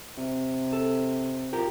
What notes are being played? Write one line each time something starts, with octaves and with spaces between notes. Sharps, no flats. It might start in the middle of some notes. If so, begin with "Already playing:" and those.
C3
A4
F4 G4 A#4